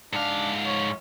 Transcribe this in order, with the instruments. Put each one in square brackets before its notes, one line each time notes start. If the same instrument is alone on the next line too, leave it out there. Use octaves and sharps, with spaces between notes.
[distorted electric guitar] G#2 F5 [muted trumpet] D4
[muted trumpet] C#5